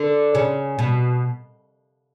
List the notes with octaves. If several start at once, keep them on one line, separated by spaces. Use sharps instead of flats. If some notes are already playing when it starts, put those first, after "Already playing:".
Already playing: D3
C#3
B2